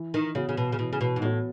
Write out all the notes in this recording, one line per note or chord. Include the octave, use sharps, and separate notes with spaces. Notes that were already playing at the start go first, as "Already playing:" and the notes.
Already playing: E3
D#3
C#3 B3 F#4 C#5
C#3
B2
C#3
B2 E3
C#3
B2
G#2
A2 B3 F#4 C#5